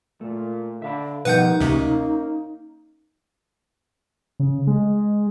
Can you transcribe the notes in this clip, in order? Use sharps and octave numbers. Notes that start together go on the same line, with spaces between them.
A#2 A3
D3 E5 F5 B5
B2 D#3 F3 G3 D#4 B4 F#5 G6
D2 C3 A#3 C#4
C#3
G#3